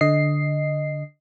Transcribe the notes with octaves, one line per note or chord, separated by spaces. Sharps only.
D3 D#5 C7